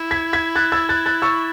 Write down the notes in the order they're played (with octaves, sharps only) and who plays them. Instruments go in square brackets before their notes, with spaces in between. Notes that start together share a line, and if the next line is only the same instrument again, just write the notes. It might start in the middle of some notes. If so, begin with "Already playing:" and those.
Already playing: [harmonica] E4
[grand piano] G#6 B6
G#6 B6
F#6 A6
E6 G#6
F#6 A6
F#6 A6
C#6 E6